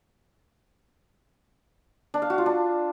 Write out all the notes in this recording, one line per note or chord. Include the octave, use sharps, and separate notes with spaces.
D4
F5
F#4
F4
D4